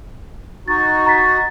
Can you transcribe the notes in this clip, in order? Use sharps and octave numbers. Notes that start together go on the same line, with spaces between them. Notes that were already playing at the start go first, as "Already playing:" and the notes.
D#4 F#4 A6
A#5 A6 B6